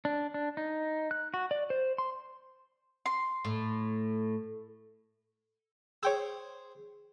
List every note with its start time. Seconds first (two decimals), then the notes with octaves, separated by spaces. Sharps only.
0.05 D4
0.34 D4
0.57 D#4
1.11 F#6
1.34 F#4
1.51 D5
1.70 C5
1.98 C6
3.06 C6
3.45 A2
6.03 G#4 C5 C#5 G5 E6